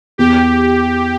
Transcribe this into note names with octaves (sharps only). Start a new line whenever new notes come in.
E2 G4